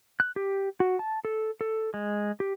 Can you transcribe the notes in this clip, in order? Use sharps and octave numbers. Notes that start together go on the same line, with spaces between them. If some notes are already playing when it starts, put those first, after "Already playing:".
F#6
G4
F#4
A5
A4
A4
G#3
G4